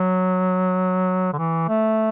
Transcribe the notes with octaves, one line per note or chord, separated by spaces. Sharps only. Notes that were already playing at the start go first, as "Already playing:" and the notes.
Already playing: F#3
D3
E3
A3